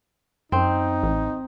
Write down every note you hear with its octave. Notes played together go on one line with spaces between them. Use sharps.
F#2 C4 D#4
A1